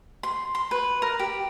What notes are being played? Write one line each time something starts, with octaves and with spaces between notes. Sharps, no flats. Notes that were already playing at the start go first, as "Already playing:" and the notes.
C6
C6
B4
A#4
G4